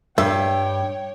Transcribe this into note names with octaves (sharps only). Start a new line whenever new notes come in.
G2 C#5 E5 G5